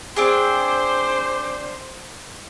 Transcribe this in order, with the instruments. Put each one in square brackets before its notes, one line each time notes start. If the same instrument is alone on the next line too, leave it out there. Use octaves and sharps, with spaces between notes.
[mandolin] C4 D4 G#4 [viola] C5 [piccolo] D6